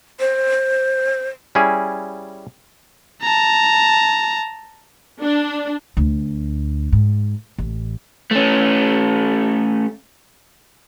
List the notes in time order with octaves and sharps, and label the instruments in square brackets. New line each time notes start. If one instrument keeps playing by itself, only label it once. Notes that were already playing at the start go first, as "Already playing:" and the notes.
[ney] C5
[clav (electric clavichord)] G3 C#4 E4 G#4
[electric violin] A5 A#5
[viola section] D4
[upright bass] D2
G#2
A1
[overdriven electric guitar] A3 C#4